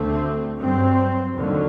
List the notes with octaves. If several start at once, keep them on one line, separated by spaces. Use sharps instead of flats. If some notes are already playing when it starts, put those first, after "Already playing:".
Already playing: D2 D3 A3 C4
G2 F#3 C4
D#2 D3 F#3